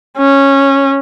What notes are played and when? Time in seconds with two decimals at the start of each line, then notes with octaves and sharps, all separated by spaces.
0.17 C#4